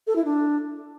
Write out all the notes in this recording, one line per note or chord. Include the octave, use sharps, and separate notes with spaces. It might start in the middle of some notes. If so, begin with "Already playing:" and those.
A4
E4
D4